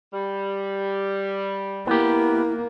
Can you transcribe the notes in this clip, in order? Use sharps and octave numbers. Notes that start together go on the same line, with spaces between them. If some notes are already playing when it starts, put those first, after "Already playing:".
G3
A#3 B3 E4 G4